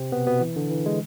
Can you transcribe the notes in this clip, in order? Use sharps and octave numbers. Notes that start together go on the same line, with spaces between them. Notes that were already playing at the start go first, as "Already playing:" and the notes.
Already playing: C3 C4
B2 B3
B2 B3
E3
D3
E3
G#3